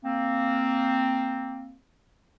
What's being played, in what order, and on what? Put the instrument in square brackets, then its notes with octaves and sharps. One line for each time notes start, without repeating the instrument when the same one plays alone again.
[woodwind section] A#3 C4